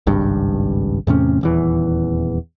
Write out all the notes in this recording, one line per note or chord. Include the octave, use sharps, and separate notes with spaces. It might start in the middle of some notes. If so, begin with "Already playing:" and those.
G#1 C#2 G2
E2 A2 C3 C#4
D#1 E2 E3